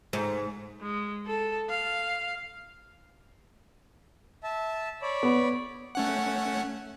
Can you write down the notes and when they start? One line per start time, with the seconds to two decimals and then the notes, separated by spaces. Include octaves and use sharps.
0.13 G#2
0.82 G#3
1.27 A4
1.70 F5
4.44 E5 A5
5.02 C#5 D5 B5
5.23 B3
5.95 A3 C#4 F#5